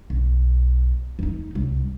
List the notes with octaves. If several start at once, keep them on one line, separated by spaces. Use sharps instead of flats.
B1
E3 D#4
C2 F#2